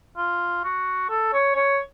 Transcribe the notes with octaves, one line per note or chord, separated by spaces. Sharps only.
F4
F#4
A4
C#5
C#5